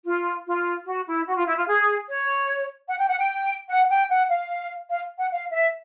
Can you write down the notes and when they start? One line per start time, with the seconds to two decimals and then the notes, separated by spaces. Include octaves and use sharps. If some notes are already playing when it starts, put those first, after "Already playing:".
0.06 F4
0.46 F4
0.87 F#4
1.07 E4
1.27 F#4
1.37 F4
1.47 E4
1.57 F4
1.68 G#4
2.08 C#5
2.88 F#5
2.99 G5
3.09 F#5
3.19 G5
3.70 F#5
3.90 G5
4.10 F#5
4.30 F5
4.91 F5
5.18 F#5
5.31 F5
5.51 E5